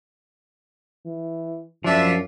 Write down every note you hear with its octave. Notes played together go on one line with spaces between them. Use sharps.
E3
F#2 F3 D4 F4 E5